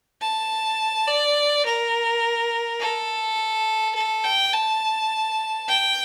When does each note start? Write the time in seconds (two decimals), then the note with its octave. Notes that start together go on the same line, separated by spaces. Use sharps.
0.21 A5
1.08 D5
1.66 A#4
2.80 A4
3.95 A4
4.25 G5
4.53 A5
5.69 G5